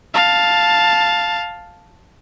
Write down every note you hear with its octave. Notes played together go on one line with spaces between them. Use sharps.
F5 A5